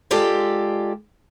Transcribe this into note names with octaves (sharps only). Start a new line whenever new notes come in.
G#3 F4 G4 A4 D5